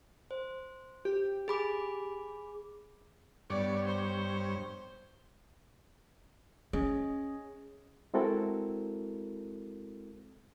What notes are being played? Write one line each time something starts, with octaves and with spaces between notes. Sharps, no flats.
C5
G4
G#4 B5 D6
G2 B3 C#5 D5
C5
C#4 G#4 C#5 D#5
G#3 C4 E4 F#4 A4 A#4